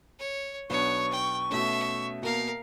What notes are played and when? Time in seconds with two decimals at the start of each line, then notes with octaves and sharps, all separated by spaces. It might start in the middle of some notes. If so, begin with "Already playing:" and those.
0.19 C#5
0.70 B1 B3 D4 C#5 C#6
1.12 G5
1.50 B2 A3 C#4 E5
2.22 B2 A#3 A#4 F5